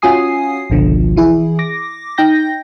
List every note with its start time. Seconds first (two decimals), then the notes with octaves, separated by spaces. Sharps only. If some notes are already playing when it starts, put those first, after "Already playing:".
0.02 C#4 F4 F#4 G#5 D#6 C7
0.70 G#1 C#2 B2 D3 F3
1.17 E3 E4 G#4
1.59 D6 A#6
2.18 D#4 G5 G6 A#6